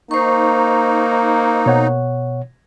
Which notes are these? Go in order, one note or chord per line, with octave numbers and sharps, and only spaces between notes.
A#3 D#4 C5 C#6
B2 C#5 F#5